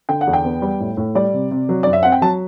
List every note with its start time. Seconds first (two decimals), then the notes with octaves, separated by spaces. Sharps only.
0.09 D3 G5
0.21 F#5
0.27 E2
0.33 G5
0.45 B3
0.62 G3
0.80 A2
0.97 A2
1.15 G3 D5
1.34 C3
1.51 C3
1.69 F#3
1.83 F#2 D5
1.93 E5
2.03 C4 F#5
2.12 G5
2.22 F#3 A5